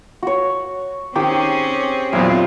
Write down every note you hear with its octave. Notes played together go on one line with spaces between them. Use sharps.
F#4 C#5
D#3 C4 C#4 G4 G#4
B1 E2 A#2 C4 F4 D#6